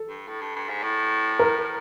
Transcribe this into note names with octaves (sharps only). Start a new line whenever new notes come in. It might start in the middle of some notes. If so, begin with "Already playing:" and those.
Already playing: A4
G2
A2
G2
G2
G#2
A2
A#4